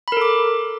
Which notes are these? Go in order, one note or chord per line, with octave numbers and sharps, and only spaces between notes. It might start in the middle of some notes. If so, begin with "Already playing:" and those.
A4 A#4 B5 D6